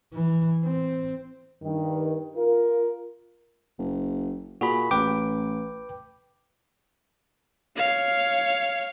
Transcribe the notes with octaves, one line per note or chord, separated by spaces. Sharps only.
E3
C4
G2 D#3
F4 A#4
F#1
A#2 F#4 G#4 B5
A1 B4 G5 D6
C#5 F5